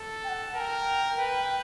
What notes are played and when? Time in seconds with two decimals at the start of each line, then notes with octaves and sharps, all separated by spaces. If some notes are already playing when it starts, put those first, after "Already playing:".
Already playing: A4
0.24 G5
0.29 F#5
0.55 A#4 A5
0.60 G5
1.19 B4